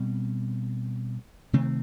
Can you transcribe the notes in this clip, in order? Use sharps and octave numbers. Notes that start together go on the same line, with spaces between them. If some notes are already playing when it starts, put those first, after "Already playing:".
Already playing: B2 G3 C4
C3 D#3 A3 C4